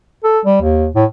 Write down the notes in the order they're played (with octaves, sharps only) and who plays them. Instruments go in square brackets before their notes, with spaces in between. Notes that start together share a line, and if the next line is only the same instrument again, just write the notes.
[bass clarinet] A4
G3
D#2
A2